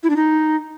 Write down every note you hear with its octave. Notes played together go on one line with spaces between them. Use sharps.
E4
D4
D#4